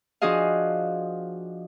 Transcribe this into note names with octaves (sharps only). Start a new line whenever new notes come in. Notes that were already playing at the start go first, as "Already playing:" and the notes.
F3 D4 F#4 G#4 D#5 F5